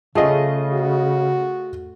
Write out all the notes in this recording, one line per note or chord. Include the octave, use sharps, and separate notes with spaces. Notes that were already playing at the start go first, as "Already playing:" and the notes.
C#3 A3 C#4 F4 G#4 D#5
F#4